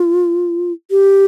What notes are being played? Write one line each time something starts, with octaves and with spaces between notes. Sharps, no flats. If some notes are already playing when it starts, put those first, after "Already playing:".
Already playing: F4
G4